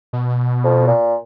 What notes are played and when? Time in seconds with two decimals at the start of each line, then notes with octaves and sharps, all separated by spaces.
0.13 B2
0.64 F2
0.87 A#2